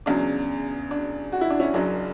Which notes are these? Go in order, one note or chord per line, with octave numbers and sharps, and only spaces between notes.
E2 C#3 F#3 D4
D4
F#4
E4
D4
C#4 E4
F#1 F#2 C#3 F#3 D4